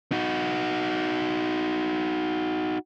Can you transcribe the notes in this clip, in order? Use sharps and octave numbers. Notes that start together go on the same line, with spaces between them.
D#4 F#4